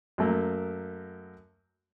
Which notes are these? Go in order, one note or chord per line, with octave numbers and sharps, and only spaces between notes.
F#2 A3 A#3